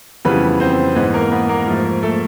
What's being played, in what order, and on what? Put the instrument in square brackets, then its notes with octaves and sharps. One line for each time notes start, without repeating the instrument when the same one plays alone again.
[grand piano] F2 C#3 E3 G3 B3 B4
C4 C5
G#2 E3 G#3 B3 B4
A#3 A#4
B3 B4
A#3 A#4
G#2 F3 A3
A3 A4